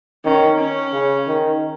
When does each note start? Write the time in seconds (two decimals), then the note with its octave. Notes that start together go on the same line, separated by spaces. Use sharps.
0.25 D#3 C#4
0.59 C#4
0.93 C#3
1.27 D#3